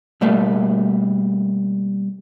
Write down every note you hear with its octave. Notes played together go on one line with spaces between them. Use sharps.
B2 G3 A3 A#3